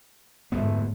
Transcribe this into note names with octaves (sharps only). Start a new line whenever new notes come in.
D1 F2 G#2 A3 B3